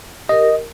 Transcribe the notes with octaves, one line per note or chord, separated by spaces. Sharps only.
G4 A#4 D#5